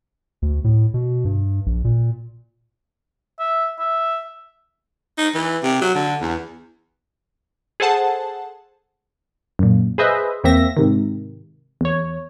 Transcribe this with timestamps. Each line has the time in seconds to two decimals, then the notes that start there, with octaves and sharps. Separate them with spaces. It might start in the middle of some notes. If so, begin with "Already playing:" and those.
0.42 D2
0.64 A2
0.94 B2
1.25 G2
1.66 A#1
1.84 A#2
3.39 E5
3.79 E5
5.18 D#4
5.34 E3
5.63 C3
5.81 F#3
5.95 D3
6.21 E2
7.80 G#4 A4 C5 F#5 A5
9.59 F#2 A#2
9.98 G#4 B4 C5 D#5 E5
10.44 E2 A#3 C4 E5 A#6
10.77 G#2 C3 D#3
11.81 E2 C#5